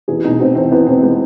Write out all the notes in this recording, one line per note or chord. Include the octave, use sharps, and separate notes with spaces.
E2 G#4
B2 D#4
B2 C4
E2 C4
E2 B3
E2 C4
G#3 B3